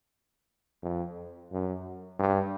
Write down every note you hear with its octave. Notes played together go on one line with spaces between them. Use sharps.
F2
F#2
G2